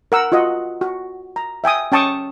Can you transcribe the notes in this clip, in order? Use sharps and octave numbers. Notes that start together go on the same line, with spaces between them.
A#4 F#5 E6
F4 F#4 D#5 F#5
F#4
A#5
E5 G5 G#5 D#6
C#4 G5 A5 C#6 D#6